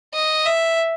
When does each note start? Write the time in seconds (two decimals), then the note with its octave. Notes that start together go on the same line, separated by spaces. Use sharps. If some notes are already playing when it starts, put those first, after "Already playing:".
0.14 D#5
0.46 E5